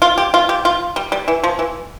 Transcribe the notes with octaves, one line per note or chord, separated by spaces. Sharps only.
F4
G4
F4
G4
F4
G3
G3
E3
F3
E3